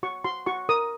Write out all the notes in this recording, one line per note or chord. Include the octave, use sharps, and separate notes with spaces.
F#4 C#6
F#4 C6
F#4 C#6
A#4 D#6